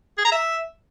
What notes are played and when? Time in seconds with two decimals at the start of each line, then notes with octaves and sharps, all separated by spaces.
0.18 G#4
0.25 A#5
0.32 E5